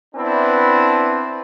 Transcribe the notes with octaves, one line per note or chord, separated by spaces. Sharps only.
B3 C4 D4 E4 B4